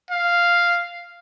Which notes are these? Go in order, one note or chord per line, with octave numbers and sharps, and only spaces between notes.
F5